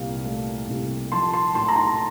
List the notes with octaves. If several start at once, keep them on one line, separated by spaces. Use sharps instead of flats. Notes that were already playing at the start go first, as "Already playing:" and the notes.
Already playing: C2 A#2 F5
A3
C2
F3 A5 C6
A5 C6
A2 A5 C6
A#5
A5 C6